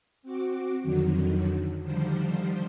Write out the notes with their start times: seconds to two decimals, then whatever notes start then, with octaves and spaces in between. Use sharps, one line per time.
0.23 C4 F#4 D6
0.81 F2 D3 D#3 F#3
1.82 D3 D#3 F3 G3 C5